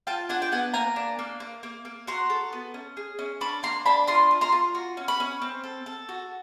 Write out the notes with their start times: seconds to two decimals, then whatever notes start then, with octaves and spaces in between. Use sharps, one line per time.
0.07 F4 G5 A5
0.29 D4 F#5 G#5
0.42 G5
0.52 B3 F#5 G#5
0.74 A#3 G#5 A#5
0.96 D4
1.19 A#3
1.40 A#3
1.63 A#3
1.85 A#3
2.07 F#4 A#5 C6
2.30 A4
2.53 B3
2.74 C#4
2.97 G#4
3.19 C#4
3.41 D4 B5 C#6
3.63 A#3 A#5 C6
3.86 D4 A5 B5
4.07 F4 A#5 C6
4.31 F4
4.41 A#5 C6
4.52 F4
4.75 F#4
4.97 C#4
5.08 B5 C#6
5.20 C#4
5.42 C4
5.64 A4
5.86 A4
6.09 F#4